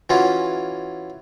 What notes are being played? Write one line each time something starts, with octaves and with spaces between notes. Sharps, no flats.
E3 C#4 F4 F#4